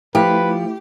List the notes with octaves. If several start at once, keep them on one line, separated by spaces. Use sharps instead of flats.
F3 A3 E4 G4 B4